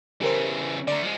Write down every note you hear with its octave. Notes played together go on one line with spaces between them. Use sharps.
C#3 E3 G4 A#4 C5
D3 A3 D5 A#5
F3 G#3